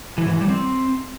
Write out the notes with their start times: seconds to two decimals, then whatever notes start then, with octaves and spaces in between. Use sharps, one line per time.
0.18 E3
0.25 G#2
0.33 E3
0.41 G3
0.49 C4